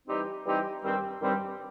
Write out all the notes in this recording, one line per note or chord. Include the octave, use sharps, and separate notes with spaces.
E3 G3 C4 D#4 G4
E3 G3 C4 D#4 G4
G2 D#3 G3 C4
G2 D#3 G3 C4